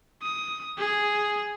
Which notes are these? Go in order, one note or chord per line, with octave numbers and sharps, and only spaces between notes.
D#6
G#4